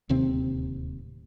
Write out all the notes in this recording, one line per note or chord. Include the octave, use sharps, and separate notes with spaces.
D1 D#2 C3 C4